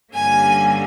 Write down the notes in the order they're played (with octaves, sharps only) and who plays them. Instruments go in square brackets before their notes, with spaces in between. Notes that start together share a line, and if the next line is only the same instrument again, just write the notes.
[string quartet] G2 D3 G3 A#3 C#4 G#5